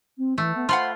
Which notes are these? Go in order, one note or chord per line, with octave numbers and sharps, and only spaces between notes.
C4
E3 A3
B3
F4 C5 F#5 B5 C6